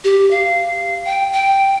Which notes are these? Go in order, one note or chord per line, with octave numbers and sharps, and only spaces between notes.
G4
F5
G5
G5